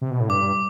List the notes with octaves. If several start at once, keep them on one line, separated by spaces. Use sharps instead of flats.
C3
B2
A2
G2 D6